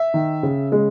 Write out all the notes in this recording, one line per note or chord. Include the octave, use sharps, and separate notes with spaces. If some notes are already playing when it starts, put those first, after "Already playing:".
Already playing: E5
D#3
C#3
G#3